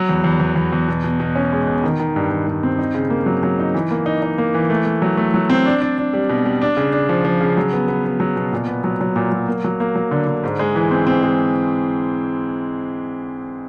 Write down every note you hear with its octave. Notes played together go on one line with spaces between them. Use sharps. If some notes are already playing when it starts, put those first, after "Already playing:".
Already playing: F#3
E2
E2
E2
E2
E2
B2
B2
B2
C#4
G#3
B2
D#3
D#3
G2
D#3
G2
C4
D#4
C#3
A#3
F#3
F#3
D#4
E3
A#3
D#4
D#4
A#3
E3
A3
A3
F#3
A3
F#3
C4
D4
D4
D4
G3
B2
G3
D4
C#3
D4
F3
F3
C#3
F#3
B3
B3
B3
F#3
B2
A#2
B3
F#3
F#3
A#2
F#3
A#3
F#3
A#3
F#3
D3
D3
G#2
G#3
E3
C4
C4
G#3